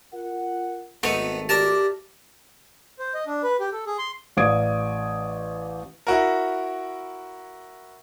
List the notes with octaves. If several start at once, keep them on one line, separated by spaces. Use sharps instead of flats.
F4 A#4 F#5
G#1 A3 B3 D#4
G4 A#4 D5 A5
C5
D#5
D4
B4
G4
A4
G#4
C6
A1 D5 F5 D#6 G#6 D7
E4 F#4 A#4